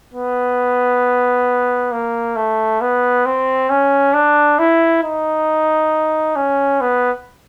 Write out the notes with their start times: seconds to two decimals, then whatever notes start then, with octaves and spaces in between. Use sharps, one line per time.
0.14 B3
1.92 A#3
2.36 A3
2.81 B3
3.26 C4
3.70 C#4
4.14 D4
4.59 E4
5.03 D#4
6.36 C#4
6.81 B3